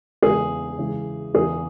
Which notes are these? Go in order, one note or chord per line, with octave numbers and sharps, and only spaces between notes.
E2 C#3 G#3 G#4
C#3 E3 G#3
E2 C#3 E3 G#4